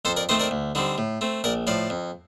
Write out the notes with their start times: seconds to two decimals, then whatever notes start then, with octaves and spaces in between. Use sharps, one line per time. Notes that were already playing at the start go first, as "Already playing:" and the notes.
0.05 F2 A4 C5
0.17 A#4 D5
0.29 D#3 A3 C4 C5 D#5
0.40 A#4 D5
0.51 D2
0.75 D3 G3 C4 D#4
0.98 A2
1.21 A3 C4
1.44 A#1 A#4 D5
1.67 A2 F3 D5 F5
1.90 F2